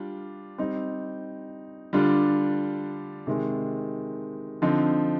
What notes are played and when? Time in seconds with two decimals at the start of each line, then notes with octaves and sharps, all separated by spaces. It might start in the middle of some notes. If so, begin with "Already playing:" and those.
Already playing: G3 D4 F4
0.58 G3 C4 D#4
1.93 D3 G3 D4 F4
3.27 C3 D#3 G#3
4.62 D3 F3 C4 D#4